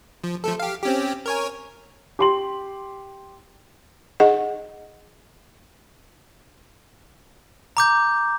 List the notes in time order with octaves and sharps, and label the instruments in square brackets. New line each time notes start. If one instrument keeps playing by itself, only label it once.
[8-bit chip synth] F3
F3 A3 A4
G4 F5
C4 C#4 G4
A#4 C#5 G#5
[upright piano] G4 C6 F#7
[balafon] D#4 G#4 D#5 F#5
[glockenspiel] A#5 D6 G6